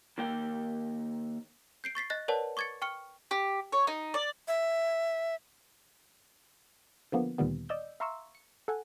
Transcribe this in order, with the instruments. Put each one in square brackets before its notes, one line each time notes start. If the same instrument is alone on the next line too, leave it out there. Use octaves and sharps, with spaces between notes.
[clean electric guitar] D#3 A#3 G5
[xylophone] G6 C7 D7
C#6 A6 B6 C7
D#5 F#6 A6 A#6
A#4 B4 C#5 D5 F#5 A5
C#6 D6 G#6 A6 C#7
G5 C#6 F6 C#7
[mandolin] G4
C#5
D#4
D5
[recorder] E5
[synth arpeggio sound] D3 F3 A#3 B3
D2 A#2 D#3 G3 B3
D5 D#5 E6 G6
E5 F5 A#5 C6 C#6 E6
C#7
A4 F#5 G#5